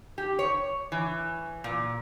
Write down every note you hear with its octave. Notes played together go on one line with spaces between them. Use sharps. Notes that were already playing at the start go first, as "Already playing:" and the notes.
G4
C#5
E3
A#2